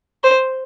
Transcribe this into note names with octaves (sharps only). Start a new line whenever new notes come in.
C5